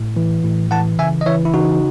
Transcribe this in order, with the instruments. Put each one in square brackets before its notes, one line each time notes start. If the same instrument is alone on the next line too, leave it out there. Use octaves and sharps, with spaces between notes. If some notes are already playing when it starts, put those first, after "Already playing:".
Already playing: [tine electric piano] A2
E3
A2
E3 F#5 A5
C#3 E5 G#5
D#5
E3 C#5 E5
E4
C#3 D#4 F#4